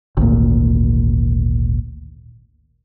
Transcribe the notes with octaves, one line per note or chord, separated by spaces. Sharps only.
G#1 D2 A#2